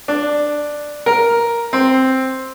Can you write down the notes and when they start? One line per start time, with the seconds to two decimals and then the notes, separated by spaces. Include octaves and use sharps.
0.08 D4
1.06 A#4
1.73 C4